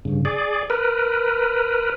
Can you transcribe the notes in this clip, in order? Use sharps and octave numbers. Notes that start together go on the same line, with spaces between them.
G2 C#3
G#4 D5
A#4 B4